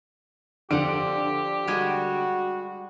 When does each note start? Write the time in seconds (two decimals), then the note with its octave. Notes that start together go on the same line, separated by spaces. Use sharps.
0.71 D3 F3 G4 F#5 D7
1.67 G3 G#3 F#4 G#4